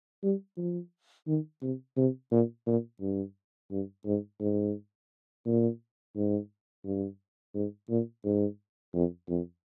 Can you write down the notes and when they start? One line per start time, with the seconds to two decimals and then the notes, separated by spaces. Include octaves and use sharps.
0.23 G3
0.57 F3
1.27 D#3
1.62 C3
1.97 C3
2.31 A#2
2.67 A#2
3.01 G2
3.71 G2
4.06 G#2
4.41 G#2
5.46 A#2
6.16 G#2
6.85 G2
7.54 G#2
7.89 A#2
8.24 G#2
8.94 F2
9.29 F2